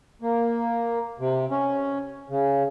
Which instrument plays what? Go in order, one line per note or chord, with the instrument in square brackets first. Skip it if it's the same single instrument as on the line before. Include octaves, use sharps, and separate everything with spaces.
[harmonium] A#3
C3
C#4
C#3